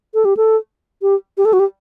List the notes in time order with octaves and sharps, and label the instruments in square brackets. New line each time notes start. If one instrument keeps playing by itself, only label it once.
[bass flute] A4
G4
A4
G4
G4
A4
F#4
G4